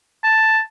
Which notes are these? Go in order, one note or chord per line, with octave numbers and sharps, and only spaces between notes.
A5